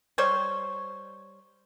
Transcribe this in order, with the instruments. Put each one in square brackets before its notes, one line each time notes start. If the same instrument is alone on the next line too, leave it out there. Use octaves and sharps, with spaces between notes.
[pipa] G3 C5 C#5